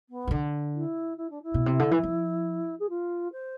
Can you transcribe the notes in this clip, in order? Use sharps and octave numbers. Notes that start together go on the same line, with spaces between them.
B3
E3
D3
E4
E4
D4
E4
B2
C3
D3
E3
F3
G#4
F4
C5